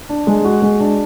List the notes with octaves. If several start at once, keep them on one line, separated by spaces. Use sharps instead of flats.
D4
G#3
F#4
G#3
D4